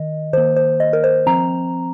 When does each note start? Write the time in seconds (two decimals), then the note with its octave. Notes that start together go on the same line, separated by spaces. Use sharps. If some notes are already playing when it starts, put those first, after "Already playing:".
Already playing: D#3 D#5
0.33 D#3 A#3 C5
0.56 C5
0.80 D#5
0.93 A#4
1.04 C5
1.26 F3 C4 A#5